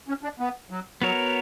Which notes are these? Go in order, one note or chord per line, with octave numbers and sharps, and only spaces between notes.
C#4
D4
B3
F#3
F#3 B3 F#4 A#4 C#5